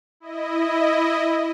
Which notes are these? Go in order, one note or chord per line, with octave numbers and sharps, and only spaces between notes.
E4 D#5